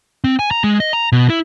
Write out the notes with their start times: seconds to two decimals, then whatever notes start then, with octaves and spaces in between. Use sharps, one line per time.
0.24 C4
0.39 G#5
0.51 A#5
0.64 G#3
0.80 D#5
0.93 A#5
1.12 B2
1.30 E4